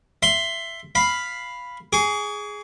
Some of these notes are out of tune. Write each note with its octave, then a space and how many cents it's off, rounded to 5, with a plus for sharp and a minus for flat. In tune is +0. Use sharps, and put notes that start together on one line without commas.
E5 +15 C6 +0
F5 +0 B5 +0
G#4 +0 C#6 +45